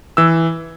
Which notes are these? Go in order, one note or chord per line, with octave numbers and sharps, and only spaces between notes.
E3 E6